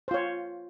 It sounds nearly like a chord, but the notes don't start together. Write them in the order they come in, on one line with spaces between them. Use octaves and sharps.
C5 F4 C#5